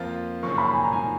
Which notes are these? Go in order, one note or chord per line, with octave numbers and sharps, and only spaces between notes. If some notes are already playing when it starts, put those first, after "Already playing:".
Already playing: F2 F3 A#3 F4
F#2 C#3 F3 A#3 C#6
B5
G#5
A#5
G#5